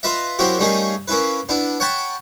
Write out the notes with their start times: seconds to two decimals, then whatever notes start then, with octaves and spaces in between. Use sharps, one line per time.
0.03 F4 B4 D#5 E5
0.39 F#3 A#3 C4 E4 F#4 G4
0.59 G3 A3 A#3 C#4 D#4 G#4
1.08 A#3 C#4 E4 B4
1.49 B3 D4 E4
1.80 C#5 F#5 G5 A5 B5